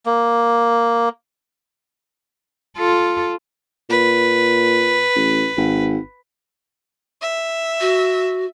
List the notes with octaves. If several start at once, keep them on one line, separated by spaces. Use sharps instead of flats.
A#3
F4 A4
A#2 B4
A1
G#1
E5
F#4